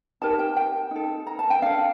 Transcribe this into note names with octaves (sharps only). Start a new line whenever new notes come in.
D#4 G4 A#4 A5
G5
G5
D#4 A4
A#5
A5
G5
D4 A4 F5